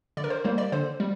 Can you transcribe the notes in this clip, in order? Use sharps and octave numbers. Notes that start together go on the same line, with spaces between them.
D3 D5
A#4
C5
G3 A#3 C5
D5
D3 C5
G3